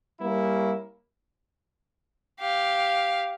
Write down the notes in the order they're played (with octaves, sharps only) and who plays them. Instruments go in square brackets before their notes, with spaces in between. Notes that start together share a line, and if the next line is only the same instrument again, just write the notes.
[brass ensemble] G3 A#3 C#4 E4
[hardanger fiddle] G4 F5